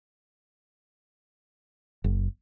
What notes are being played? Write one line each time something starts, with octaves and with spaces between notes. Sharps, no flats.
F#1